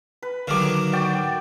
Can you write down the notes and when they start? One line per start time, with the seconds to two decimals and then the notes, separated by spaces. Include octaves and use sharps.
0.22 B4
0.48 D3 D#3 F#3 F5 D6
0.93 F#4 D5 G5